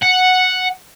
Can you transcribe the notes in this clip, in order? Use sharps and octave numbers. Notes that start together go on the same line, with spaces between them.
F#5